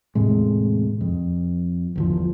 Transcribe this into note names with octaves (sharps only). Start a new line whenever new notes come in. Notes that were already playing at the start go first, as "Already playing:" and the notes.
E2 A2 C3 G#3
F2
G1 E2 F3